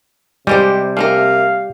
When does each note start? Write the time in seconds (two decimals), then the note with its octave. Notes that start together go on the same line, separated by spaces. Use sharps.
0.47 C3 G3 G#3 G4 C5
0.97 A3 A#3 A#4 F5